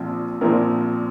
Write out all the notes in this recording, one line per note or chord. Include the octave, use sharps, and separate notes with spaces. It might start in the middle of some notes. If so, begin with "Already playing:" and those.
Already playing: A#1 A#2 F3 C4
A#1 A#2 F3 C4 A#4